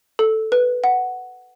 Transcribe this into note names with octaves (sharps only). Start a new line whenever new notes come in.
A4
B4
F#5